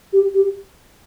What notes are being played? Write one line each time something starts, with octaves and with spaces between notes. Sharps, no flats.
G4
G4